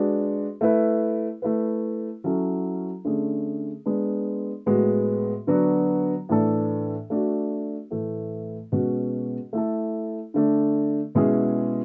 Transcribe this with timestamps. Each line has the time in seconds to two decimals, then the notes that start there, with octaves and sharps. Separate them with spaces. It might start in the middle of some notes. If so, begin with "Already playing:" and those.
Already playing: G#3 D4 F#4 B4
0.61 A3 E4 B4
1.42 A3 E4 B4
2.24 F#3 C#4 E4 A4
3.05 D3 A3 C#4 G#4
3.86 G#3 B3 D4
4.66 A2 G#3 B3 F#4
5.47 D3 F#3 B3 D4 F#4
6.29 A2 E3 A3 D4 A4
7.10 A3 D4 F#4
7.91 A2 E3 A3
8.72 B2 G#3 C#4 F#4
9.53 A3 E4 A4
10.34 D3 A3 D4
11.15 B2 G#3 C#4 E4 G#4